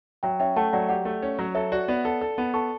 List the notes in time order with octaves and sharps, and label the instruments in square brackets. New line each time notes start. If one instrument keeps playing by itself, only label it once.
[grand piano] F#3 [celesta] E5 G5
[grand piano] C#4 [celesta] E5 G5
[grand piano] A3 [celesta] F#5 A5
[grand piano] F#3 [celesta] D5 F#5
[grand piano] G4 [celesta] D5 F#5
[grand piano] A3
C#4
F#3
[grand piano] A4 [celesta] C#5 E5
[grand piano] F#4 [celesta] D5 F#5
[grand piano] B3 [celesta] D5 F#5
[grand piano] A4
A4
B3
[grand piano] A4 [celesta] A5 C#6